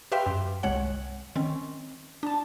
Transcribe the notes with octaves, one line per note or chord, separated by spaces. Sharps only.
G4 B4 E5 F5 G5 C6
F#2
G1 C2 G#3 C#5 F#5
D#3 C4 C#4
D4 A5